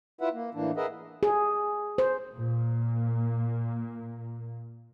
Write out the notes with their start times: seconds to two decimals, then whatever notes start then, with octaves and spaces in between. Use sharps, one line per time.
0.21 E4 F4 B4 E5 F#5
0.33 A#3
0.54 A2 E3 A#3 D4
0.76 G#4 A#4 B4 D#5 E5 F#5
1.23 G#4
1.98 C5
2.37 A#2 A#3